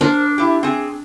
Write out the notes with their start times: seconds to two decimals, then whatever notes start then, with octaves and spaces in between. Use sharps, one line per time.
0.01 D4 A#4 C5
0.38 E4 G4
0.63 C4 G#4